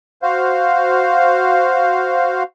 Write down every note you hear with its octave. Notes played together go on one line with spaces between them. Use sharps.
F#4 C5 F5